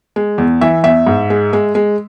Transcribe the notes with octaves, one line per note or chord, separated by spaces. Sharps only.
G#3
E2
E3 E5
E2 E5
G#2
G#3
G#3
G#3